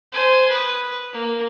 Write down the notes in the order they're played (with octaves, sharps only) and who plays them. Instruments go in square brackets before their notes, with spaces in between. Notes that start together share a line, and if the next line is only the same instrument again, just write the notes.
[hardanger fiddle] C5 G#5
B4 D#6
A#3